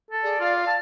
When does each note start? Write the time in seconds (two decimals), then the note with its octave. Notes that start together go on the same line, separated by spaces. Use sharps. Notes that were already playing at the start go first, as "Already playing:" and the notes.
0.11 A4
0.23 G#4 D5
0.40 F4 F5
0.67 A5